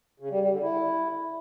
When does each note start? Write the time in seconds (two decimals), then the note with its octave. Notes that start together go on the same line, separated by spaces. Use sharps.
0.20 C#3
0.31 G3
0.41 G3
0.52 D3
0.62 E4